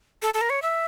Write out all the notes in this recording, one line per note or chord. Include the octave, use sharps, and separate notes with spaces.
A4
A4
A#4
C#5
E5